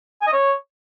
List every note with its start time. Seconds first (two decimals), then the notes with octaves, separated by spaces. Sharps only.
0.22 G#5
0.27 D#5
0.33 C#5